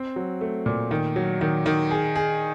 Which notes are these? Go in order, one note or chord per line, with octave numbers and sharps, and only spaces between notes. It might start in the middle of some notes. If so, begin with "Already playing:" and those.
Already playing: C4
F#3
A3
A#2
D#3
F#3
D#3
D#3
G#4
G#4